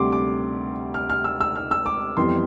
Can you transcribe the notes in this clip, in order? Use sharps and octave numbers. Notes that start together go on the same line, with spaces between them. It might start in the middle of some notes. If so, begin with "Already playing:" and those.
Already playing: D2 C3 G3 C6 D6
D6
F6
F6
E6
E6
F6
E6
D6
F2 E3 G3 B3 C6